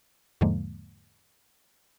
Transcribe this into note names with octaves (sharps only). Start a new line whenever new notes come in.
E2 G#2 D3 F3 G#3 A#3